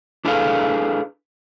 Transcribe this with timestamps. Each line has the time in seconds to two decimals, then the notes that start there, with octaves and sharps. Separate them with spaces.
0.25 D4 E4 G#4 A4 B4 F5